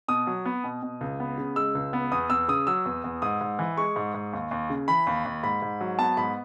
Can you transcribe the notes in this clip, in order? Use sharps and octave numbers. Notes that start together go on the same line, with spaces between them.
B2 D#6
F#3
B3
B2
B2
C#2
B3
C#3
G#3 E6
C#2
B3
E2 D#6
E2 E6
C#3 D#6
F#3 E6
E2
E2
G#2 D#6
G#2
E3
G#3 C#6
G#2
G#2
D#2
D#2
C#3
E3 B5
D#2
D#2
G#2 B5
G#2
F#3
B3 A5
G#2 B5